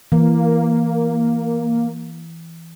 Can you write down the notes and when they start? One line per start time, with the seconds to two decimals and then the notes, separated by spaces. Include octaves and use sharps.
0.12 E3 A#3